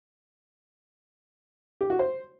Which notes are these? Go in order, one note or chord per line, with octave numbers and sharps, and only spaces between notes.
G4
F#4
C5